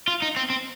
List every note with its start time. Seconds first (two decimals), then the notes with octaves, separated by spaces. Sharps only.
0.08 F4
0.22 D#4
0.36 C4
0.50 C4